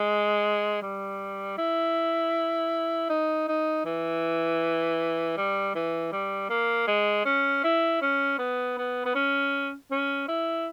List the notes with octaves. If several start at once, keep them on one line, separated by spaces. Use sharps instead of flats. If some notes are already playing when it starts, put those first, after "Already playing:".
Already playing: G#3
G3
E4
D#4
D#4
E3
G3
E3
G3
A#3
G#3
C#4
E4
C#4
B3
B3
B3
C#4
C#4
E4